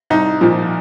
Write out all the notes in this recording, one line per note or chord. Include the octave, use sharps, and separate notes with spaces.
C2 D#4
A#2 F3